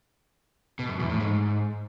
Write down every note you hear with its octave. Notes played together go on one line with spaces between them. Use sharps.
B2
F#2
E2
A2
G#2